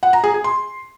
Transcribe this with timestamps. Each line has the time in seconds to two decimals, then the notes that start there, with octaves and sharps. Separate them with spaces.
0.03 F#5
0.13 A#5
0.24 G#4
0.34 G#4
0.44 C6